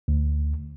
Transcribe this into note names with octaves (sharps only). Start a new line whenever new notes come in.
D2